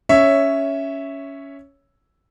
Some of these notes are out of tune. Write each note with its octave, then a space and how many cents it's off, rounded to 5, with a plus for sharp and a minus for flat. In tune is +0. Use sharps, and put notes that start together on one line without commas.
C#4 +10 C#5 +0 E5 +0